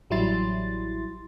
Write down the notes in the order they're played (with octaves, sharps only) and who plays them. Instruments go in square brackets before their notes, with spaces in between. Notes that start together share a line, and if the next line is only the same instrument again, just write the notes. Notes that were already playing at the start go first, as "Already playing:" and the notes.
[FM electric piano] A1 F#3 G3 E4 C6 A6